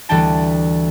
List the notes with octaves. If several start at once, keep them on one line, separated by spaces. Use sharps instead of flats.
D2 E3 G3 D4 G5 A5